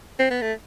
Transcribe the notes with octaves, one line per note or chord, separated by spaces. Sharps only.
C4
B3
A3